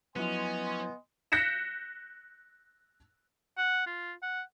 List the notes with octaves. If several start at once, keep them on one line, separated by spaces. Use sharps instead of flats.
F3 F#3 B3 C#4 E4 D#5 G#5 C6
F#6 G6 A#6 B6 C#7 E7
F#5
F4
F#5